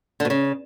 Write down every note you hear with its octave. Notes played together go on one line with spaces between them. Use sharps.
D3
B2
C#3